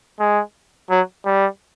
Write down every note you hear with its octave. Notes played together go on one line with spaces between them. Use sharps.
G#3
F#3
G3